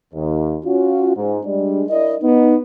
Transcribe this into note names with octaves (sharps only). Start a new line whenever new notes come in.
D#2
C#4 F4 F#4
G#2
G3 G#3 D4
E4 A#4 D5 D#5
B3 D#4